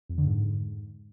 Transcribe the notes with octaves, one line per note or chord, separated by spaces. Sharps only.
F2
D3
G#2